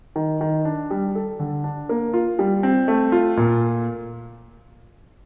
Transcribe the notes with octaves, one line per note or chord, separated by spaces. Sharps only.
D#3
D#3
D4
G3
A4
D3
D4
A#3
F4
G3
C4
A3
F4
A#2